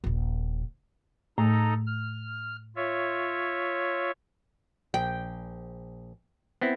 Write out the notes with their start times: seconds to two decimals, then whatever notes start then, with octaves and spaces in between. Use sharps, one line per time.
0.04 D#1 A#1
1.38 A2 A3 D#4 A4 A#5
1.87 F6
2.76 F4 C#5 E5
4.94 A#1 G5
6.61 B3 C4 E4